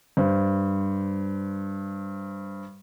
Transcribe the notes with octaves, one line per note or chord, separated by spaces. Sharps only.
G2 C5